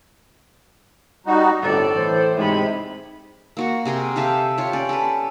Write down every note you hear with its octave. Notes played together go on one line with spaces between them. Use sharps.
G3 D#4 F#4
G1 A2 C4 A4 D5
A2 E3 C5
G#2 C3 G#3 B5
A#3 F#4 C#6
C3 G#4 A#4 C6
G4 A4 E5 F5
F4 G4 C#5
C#4 D5
A4 B4